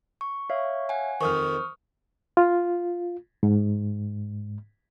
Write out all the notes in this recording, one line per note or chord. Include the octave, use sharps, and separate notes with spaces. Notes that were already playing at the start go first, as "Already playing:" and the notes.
C#6
C#5 E5 F5
F#5 G#5
F2 D#3 C5 C#6 D#6 F6
F4
G#2